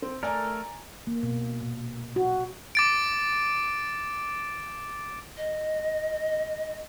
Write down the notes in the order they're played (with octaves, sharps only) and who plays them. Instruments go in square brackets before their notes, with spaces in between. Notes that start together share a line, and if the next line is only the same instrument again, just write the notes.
[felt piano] C4
[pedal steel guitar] A3 A4 A#4 [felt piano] D5 G#5 A#5
[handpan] A#3
B2
A#2
F#4
[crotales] D6 A6 D7
[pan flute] D#5